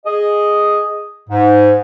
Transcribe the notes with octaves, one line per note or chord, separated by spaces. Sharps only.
G#4 D#5
G#2